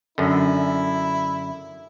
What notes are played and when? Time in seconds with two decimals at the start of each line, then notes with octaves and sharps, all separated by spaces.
0.18 F#2 D3 E4